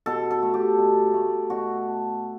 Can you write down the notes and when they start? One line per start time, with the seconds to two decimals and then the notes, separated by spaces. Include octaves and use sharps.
0.06 B2 A4
0.31 A4
0.42 A3
0.54 G4
0.78 B2
1.14 A3
1.50 B2 F#4